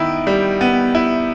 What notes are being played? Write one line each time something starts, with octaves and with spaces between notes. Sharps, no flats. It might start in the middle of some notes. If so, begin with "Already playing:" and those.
Already playing: D#3 B3 E4
G3
B3
E4